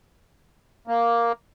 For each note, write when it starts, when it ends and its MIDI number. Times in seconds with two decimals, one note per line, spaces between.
0.87 1.32 58